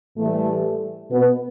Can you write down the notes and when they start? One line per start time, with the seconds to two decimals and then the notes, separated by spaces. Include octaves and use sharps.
0.18 A2 E3 G3 A3
1.11 B2 B3